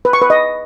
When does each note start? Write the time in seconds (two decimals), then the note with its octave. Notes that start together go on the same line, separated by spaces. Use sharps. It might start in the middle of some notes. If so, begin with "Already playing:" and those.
0.05 B4
0.13 C#6
0.22 B4
0.30 D#5